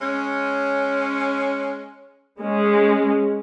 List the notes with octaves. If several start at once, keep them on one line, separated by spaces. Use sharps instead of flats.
G#3 C#4
G#3 C#4